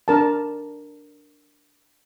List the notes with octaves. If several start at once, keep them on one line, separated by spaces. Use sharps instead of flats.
D4 A#4 A5